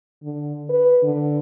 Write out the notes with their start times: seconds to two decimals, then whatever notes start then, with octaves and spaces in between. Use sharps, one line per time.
0.23 D3
0.69 B4
1.03 D3